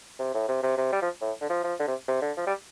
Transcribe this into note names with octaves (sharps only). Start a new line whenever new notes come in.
C3
A2
C3
C3
C3
G3
F3
A2
D3
F3
F3
D3
C3
C3
D3
F3
G3